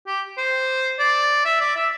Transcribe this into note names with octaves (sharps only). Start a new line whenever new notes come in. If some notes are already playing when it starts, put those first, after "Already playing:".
G4
C5
D5
E5
D5
E5